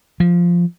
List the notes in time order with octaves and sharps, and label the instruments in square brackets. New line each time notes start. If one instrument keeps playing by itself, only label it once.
[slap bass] F3